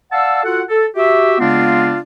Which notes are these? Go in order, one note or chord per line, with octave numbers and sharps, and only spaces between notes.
D5 F5 F#5 A5 E6
F4 F#4 A4 F#5
A4
F#4 G4 E5
C#3 G#3 B3 C4 D4 F4